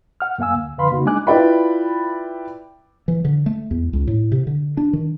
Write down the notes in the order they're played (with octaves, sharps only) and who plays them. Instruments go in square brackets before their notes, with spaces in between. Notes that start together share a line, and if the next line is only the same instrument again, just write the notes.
[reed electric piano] F#5 F6
F#2 A#3 F5 G#5 E6
D2
F2 D3 B4 F5 B5 C6
C#3 A#3 D#4 F#4
G#3 D4 D#4 G#5 D6 F#6
[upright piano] E4 F4 B4 D5 G5 B5
[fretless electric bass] E3
D3
A3
E2
C#2
A2
C3
D3
D4
D#3